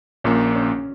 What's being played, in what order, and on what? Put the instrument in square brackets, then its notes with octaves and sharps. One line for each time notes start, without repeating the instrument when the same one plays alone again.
[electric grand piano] A#1 A#2 A#3 [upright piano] C#4
[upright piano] C#4